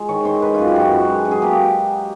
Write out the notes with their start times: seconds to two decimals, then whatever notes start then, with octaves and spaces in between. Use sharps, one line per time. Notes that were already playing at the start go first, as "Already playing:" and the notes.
Already playing: G#3
0.09 D#3 C#5
0.25 D#3 C5
0.42 D#3 B4
0.54 F#2 F4
0.67 G4
0.76 F#2 F#4
0.92 F#2
1.09 G#3
1.25 F#2
1.31 G#4
1.42 A#3 G4